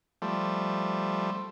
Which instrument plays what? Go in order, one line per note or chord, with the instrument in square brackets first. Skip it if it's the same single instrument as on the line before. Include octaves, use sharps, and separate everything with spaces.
[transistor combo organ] F3 G3 A3